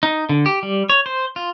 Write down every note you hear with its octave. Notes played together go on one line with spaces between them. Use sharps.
D#4
D3
G4
G3
C#5
C5
F4